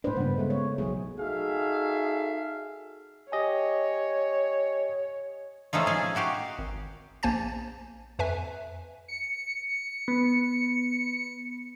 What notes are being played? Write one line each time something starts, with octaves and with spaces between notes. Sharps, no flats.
A2 D4 B4 C5
G2 C#3 A#3 B3
G#3 A3 B3
C#5
B1 F#3 A3 G#4
D#4 F#4 G#4 A4 E5 F5
G4 C#5 D#5 G#5
F3 A3 C#4 D#4 F4
G#3 F4 G#4 G#5
D#4 F#4 G4 F5
G#1
A#1 A#3 C5 G#5 A5 A6
F2 B4 E5 G#5
C#7
B3